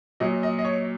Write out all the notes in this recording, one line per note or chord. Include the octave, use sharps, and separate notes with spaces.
A#2 F#3 D#5
D#5
D#5
C#5